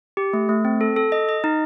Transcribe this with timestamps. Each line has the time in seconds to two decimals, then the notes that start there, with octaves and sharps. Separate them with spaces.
0.17 G4
0.33 A3
0.49 A3
0.65 C4
0.81 A4
0.96 A4
1.12 D#5
1.29 D#5
1.44 D#4